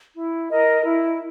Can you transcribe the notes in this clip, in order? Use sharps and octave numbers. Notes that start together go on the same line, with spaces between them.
E4
A#4 D#5
E4